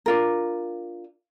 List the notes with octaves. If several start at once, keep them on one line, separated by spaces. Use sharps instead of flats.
D4 F4 A#4